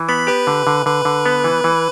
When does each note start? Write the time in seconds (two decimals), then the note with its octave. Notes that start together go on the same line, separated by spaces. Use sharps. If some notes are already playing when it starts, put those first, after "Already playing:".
Already playing: E3
0.08 B3 B5
0.27 G4 B4
0.47 D3
0.67 D3
0.86 D3 B4
1.05 D3
1.26 B3
1.44 E3
1.64 E3